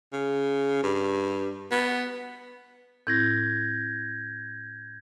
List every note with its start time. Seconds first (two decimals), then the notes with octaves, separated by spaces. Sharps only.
0.13 C#3
0.83 G2
1.71 B3
3.07 A2 C4 E4 G6 G#6 A#6